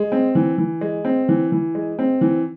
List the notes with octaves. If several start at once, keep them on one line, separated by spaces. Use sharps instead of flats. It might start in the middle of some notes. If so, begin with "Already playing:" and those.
Already playing: G#3
C4
E3
E3
G#3
C4
E3
E3
G#3
C4
E3